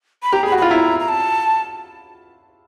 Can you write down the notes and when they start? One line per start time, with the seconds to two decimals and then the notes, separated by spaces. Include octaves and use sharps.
0.23 B5
0.33 G4 A#5
0.43 G#4 B5
0.52 F#4
0.58 B5
0.62 F4
0.70 E4 A#5
1.00 A#5
1.08 A5